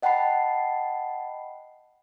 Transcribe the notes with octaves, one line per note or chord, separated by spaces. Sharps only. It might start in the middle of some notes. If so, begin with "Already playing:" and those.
D#5 F#5 G5 A5 B5 C7